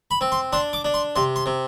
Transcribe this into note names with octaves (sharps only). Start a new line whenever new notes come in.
B5
C4
C6
D4 C6
D6
D4
C6
C3 C6
C6
C3